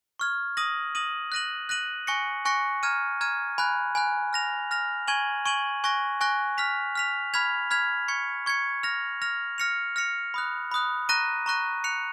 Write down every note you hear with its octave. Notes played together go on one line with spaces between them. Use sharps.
C#6 F6 G#6
D#6 A#6 D#7 F#7
D#6 A#6 D#7 F#7
F#6 A#6 D#7 F#7
F#6 A#6 D#7 F#7
G#5 C#6 F#6 A#6 C#7
G#5 C#6 F#6 A#6 C#7
A#5 F6 G#6 D#7
A#5 F6 G#6 D#7
G#5 B5 F#6
G#5 B5 F#6
F6 A#6 F7
F6 A#6 F7
G#5 C#6 G#6 D#7 F#7
G#5 C#6 G#6 D#7 F#7
G#5 C#6 F#6 A#6
G#5 C#6 F#6 A#6
F6 B6 F7
F6 B6 F7
B5 F6 G#6 B6 F7
B5 F6 G#6 B6 F7
C#6 G#6 C#7
C#6 G#6 C#7
F6 A#6 F7
F6 A#6 F7
F6 A#6 C#7 F7
F6 A#6 C#7 F7
B5 D#6 F#6
B5 D#6 F#6
A#5 C#6 F#6 A#6 D#7
A#5 C#6 F#6 A#6 D#7
F#6 C#7 F7